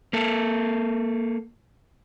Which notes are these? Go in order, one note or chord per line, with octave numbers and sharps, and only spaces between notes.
A#3 A4